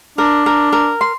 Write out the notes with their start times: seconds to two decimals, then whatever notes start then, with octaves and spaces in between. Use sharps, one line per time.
0.18 D4 A#4
0.46 A#4
0.72 A#4
1.01 C6